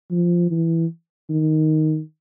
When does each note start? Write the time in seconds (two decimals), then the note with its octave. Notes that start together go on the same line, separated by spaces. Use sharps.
0.11 F3
0.51 E3
1.29 D#3